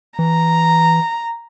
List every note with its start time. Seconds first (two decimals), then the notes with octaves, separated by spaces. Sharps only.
0.19 E3 A#5